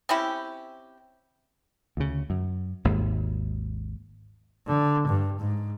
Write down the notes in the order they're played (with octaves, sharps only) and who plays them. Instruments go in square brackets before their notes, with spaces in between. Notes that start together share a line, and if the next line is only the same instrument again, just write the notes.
[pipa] C4 C#4 E4 G4
[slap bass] D2 C#3
F#2
G#1 D#2 G#2
[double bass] D3
G2
G#2